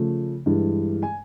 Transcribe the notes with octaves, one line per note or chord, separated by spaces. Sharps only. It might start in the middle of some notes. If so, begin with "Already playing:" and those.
Already playing: C#3 F3 A3
G2 E3 G#3
G#5